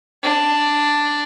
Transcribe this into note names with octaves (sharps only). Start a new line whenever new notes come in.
D4